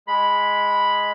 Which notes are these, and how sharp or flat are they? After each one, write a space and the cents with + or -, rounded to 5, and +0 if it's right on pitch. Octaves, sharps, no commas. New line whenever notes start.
G#3 +0 B5 +0